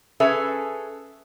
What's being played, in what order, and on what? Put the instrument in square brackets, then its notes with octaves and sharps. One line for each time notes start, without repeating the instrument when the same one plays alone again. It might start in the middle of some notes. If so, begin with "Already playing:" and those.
[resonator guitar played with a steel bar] C#4 G#4 A4 B4 E5